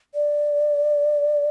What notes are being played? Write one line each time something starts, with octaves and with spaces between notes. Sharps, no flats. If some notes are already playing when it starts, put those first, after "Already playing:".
D5